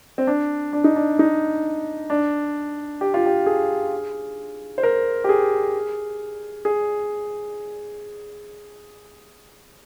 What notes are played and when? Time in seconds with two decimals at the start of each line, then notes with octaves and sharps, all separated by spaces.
0.18 C4
0.27 D4
0.73 D4
0.84 D#4
0.96 D4
1.19 D#4
2.10 D4
3.01 G4
3.14 F4
3.26 G4
3.46 G#4
4.78 C5
4.83 A#4
5.24 G4
5.29 G#4
6.65 G#4